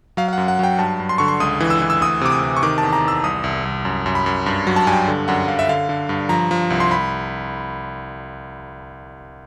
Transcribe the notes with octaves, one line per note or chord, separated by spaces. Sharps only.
F#3 F5
F5
F#2 F#5
F#5
F#3 G5
G2 A5
G2
C6
D3 C#6
C6
C#2 D#6
E3
E6
E3
E6
D2 D#6
C3 D6
D#6
C3
C#6
D#3 D6
A5
E2
A#5
E2 E6
C2 D#6
C2
C2
F#2
F#2
B5
F#2
G2
F#3
A5
G2 G#5
G5
D3
F#2 F#5
F#2 F5
E5
D3 F5
D3
G2
F3 A#5
F3
C2
C6
B5